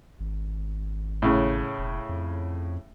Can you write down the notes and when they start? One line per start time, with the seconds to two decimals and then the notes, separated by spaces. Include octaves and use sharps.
0.20 G#1
1.22 A2 C#3
1.78 E1
2.09 F2